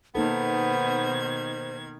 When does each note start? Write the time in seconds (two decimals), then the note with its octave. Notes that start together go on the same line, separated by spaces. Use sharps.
0.15 B2 D#3 A#3 B3 D#4 A4 C5 G#6